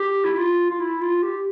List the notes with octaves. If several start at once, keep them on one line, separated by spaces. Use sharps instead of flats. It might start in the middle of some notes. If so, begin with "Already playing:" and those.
Already playing: G4
E4
F4
F4
E4
F4
G4